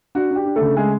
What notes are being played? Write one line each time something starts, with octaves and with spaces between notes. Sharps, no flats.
D4 F#4
D4 G4
D4
A3 A4
C#3
G#3 A3 G#4